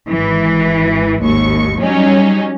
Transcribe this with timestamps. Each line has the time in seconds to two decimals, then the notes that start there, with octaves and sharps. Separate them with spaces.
0.11 G#1 E3
1.22 G#1 D#2 C#6
1.80 F#3 G3 C#4 D#4